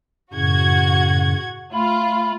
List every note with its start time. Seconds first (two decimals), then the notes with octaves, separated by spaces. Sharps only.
0.33 F#2 A2 C#3 F#4 F#5 G#6
1.73 A3 F4 B5